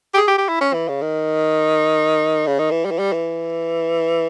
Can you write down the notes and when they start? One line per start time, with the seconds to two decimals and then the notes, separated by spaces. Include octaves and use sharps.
0.14 G4
0.17 G#4
0.28 G4
0.38 G4
0.49 E4
0.61 C#4
0.74 E3
0.88 C#3
1.02 D#3
2.47 C#3
2.59 D#3
2.71 E3
2.85 G3
2.91 E3
2.99 G3
3.13 E3